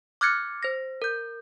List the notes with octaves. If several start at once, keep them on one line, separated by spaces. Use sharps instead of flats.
D6 F6 F#6 G#6 A6 C#7
C5 A#6
A#4 G6